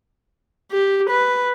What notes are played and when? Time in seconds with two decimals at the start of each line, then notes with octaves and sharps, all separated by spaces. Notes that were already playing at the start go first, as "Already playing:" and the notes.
0.72 G4
1.10 B4